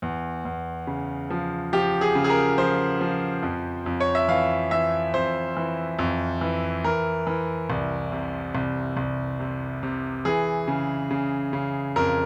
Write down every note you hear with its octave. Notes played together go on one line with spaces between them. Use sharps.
E2
E2
C#3
F3
F3 G4
G#4
C#3
G#4
A#4
F3 C5
F3
F2
F2
C#5
E5
E3 F5
E3 E5
F2 C5
E3
F2
E3
E3 A#4
E3
C2
C3
C2
C2
C3
C3
E3 G#4
C#3
C#3
C#3
F2 A#4